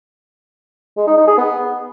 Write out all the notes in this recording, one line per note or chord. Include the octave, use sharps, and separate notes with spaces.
G#3
D#4
D#4
G#4
B3